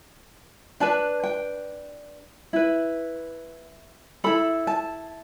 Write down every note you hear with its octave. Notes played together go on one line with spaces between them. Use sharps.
D4 B4 A5
G5
E4 B4
E4 A4 B5
A5